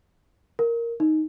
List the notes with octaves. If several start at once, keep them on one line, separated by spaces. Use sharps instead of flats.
A#4
D#4